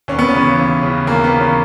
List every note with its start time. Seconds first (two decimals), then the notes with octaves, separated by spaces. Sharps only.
0.08 D#2 C#4
0.19 B3
0.29 C#4
0.34 C#3 E3
0.59 D#2
0.82 C#3 E3
1.07 D#2 A#3
1.24 B3
1.32 C#3 E3
1.41 C#4